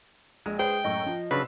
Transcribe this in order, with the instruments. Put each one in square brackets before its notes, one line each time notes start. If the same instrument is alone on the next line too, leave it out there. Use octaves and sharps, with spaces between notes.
[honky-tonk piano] A#1 [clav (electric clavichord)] G#3
[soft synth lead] G#4 [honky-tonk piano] B4 C5 [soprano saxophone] G5
[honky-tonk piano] F#2 A2 C#6 [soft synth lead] D#5
[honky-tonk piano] F3
[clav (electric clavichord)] C#3 F#3 D4 [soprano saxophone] B4 [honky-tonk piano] C6 E6